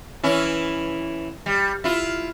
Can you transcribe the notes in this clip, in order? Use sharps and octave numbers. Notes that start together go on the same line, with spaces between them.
E3 C#4 E4
G3
E4 F4